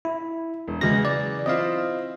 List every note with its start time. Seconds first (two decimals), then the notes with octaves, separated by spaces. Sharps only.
0.05 E4
0.68 E1
0.81 C#3 E3 F#3 G#3 A#6
1.05 D5
1.46 C4 E4 F4 D#5 F5